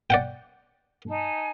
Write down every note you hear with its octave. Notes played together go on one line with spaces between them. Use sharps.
D5 F#5 G5
D#4 G#5 A5